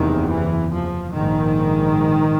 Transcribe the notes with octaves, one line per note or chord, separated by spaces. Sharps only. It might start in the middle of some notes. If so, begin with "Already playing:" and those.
Already playing: F#1 E2 C3 D#3
E3
F3
A#1 G#2 D#3